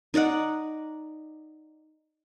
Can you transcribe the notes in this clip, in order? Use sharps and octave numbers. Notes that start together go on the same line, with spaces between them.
D#4 D5 D#5 F#5